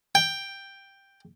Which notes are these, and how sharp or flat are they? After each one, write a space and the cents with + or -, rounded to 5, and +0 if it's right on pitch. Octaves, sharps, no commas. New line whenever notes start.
G5 +5